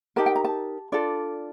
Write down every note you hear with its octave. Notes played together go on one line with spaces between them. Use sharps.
D#4 G4 A#4 A5
G5
A#5
A5
D4 F4 A4 D5